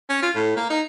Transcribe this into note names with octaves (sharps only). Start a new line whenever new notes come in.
C#4
F4
A2
A#3
D#4